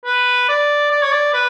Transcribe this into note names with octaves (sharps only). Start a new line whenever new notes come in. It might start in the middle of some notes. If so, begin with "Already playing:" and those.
B4
D5
D5
C#5
D5
B4